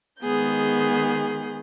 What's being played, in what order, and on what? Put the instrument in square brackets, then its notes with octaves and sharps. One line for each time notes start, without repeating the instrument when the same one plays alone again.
[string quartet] D#3 G#3 B3 G#4 G6